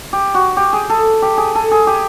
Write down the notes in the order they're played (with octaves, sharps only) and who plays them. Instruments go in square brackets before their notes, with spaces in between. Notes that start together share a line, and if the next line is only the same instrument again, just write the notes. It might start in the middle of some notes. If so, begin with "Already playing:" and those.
[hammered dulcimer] G4
F#4
G4
G#4
A4
G4
G#4
A4
G#4
G4